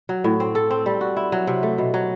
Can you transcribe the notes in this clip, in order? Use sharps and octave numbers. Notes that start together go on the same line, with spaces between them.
F#3
A2
C4
A4
C4
G3
F#4
E4
F#3
C3
A3
B2
F#3